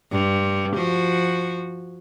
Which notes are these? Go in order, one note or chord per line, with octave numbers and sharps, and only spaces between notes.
G2
F3 F#4